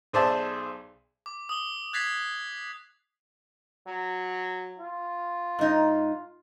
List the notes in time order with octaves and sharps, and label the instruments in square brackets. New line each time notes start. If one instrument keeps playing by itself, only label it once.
[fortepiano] B1 G#4 C5 D5 E5 A5
[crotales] D6
D#6 G7
F#6 G#6 A6 B6 C7 F7
[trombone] F#3
F4
[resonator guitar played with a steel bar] G#2 D#4